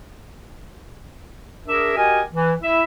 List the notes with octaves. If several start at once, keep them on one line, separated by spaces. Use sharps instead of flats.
D4 G#4 A#4 E5
F#4 G4 A#4 D#5 G5 G#5
E3
E4 E5